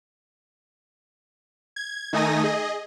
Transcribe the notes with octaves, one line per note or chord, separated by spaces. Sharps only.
G#6
D#3 A3 D#4 G#5 D#6 A#6
G#4 D#5